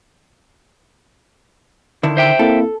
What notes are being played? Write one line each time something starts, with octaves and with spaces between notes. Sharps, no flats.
D3 D#3 E4
C5 E5 G5
A#3 C4 E4 A4